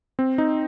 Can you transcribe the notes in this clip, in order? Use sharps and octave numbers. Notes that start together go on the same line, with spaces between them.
C4
D#4